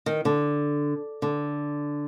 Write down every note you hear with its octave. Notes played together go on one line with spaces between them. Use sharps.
D#3
D3
D3